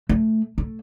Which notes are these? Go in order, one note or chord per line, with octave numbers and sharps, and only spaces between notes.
A3
A3